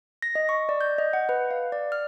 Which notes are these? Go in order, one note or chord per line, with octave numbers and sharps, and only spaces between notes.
A#6
D#5
C#6
D5
G6
D#5
F#5
B4
F5
D5
F6